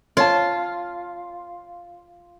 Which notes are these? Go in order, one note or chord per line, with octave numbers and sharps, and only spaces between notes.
F4 C#5 A5